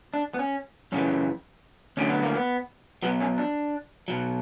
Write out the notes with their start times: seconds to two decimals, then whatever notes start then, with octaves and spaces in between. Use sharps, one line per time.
0.14 D4
0.34 B3
0.39 C#4
0.92 F#2 C#3 E3 C#4
1.97 D2 D3 F#3 C#4
2.10 B3
2.23 A#3
2.36 B3
3.02 B1 B2 F#3 B3
3.21 C#4
3.38 D4
4.08 B1 B2 F#3